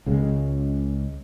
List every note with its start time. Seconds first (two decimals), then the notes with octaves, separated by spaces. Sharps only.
0.06 C#2 C#3 G#3